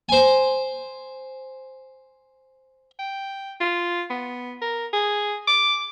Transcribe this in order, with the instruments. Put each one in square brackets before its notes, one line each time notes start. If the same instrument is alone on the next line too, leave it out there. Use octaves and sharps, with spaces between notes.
[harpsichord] C5 G#5
[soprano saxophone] G5
F4
B3
A#4
G#4
D6